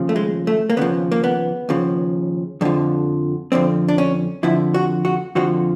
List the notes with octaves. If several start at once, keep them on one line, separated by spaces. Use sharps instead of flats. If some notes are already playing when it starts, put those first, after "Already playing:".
Already playing: D#2 C#3 F3
A3
G#3
A3
A#3
D#2 C#3 F3 B3
A#3
B3
D#2 C#3 F3
F2 D3 F3
F2 D3 F3 C4
D4
C#4
F2 D3 F3 E4
F#4
F#4
F2 D3 F3 F#4